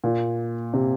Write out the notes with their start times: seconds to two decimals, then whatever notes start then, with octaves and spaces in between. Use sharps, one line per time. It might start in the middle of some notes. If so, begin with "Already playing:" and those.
0.04 A#2
0.74 C3